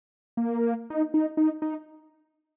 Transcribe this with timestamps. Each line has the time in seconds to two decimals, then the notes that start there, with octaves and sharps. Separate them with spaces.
0.37 A#3
0.90 D#4
1.14 D#4
1.37 D#4
1.62 D#4